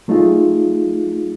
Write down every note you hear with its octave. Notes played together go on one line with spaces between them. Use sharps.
F#3 A3 D#4 F4 G#4